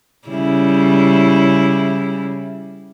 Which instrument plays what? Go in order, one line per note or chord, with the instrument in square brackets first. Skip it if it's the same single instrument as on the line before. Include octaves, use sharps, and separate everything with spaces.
[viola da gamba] C#3 G3 E4